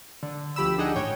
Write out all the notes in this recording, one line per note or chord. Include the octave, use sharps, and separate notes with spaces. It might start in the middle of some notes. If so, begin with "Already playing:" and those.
D3
D2 F3 G4 B5 E6
D4 D#4 G#4 D#5 F#5 G5
A1 G#2 C#5 G5